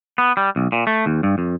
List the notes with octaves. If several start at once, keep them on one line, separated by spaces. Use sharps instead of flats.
B3
G3
B1
A#2
A3
D#2
G2
F2